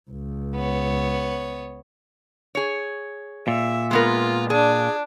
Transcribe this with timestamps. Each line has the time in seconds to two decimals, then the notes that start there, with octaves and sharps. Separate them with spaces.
0.11 C#2
0.55 B3 C#5
2.55 G#4 C#5
3.48 A#2 E5
3.91 G#3 B3 F4 A#4
4.50 D4 G#4